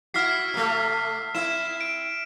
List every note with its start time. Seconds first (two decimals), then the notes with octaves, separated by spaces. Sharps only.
0.14 E4 F#4 F6 B6 C7
0.54 C3 A3
1.35 C4 E4 E7
1.81 D7